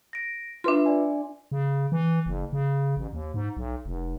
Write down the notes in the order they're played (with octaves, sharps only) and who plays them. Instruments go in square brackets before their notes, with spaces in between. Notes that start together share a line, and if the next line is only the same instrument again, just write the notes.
[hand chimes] A#6 D7
[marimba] D4 C6 [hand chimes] F4 B4 E5
[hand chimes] D5 G#5
[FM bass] C#3
E3
F#1
C#3
A1
D#2
G#2
B1
F1